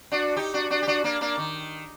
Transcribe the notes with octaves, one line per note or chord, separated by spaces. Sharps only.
D4 F#4
D#4 G4
D4 F#4
D4 F#4
G4
D4 F#4
A#3 D4
A#3 D4
D#3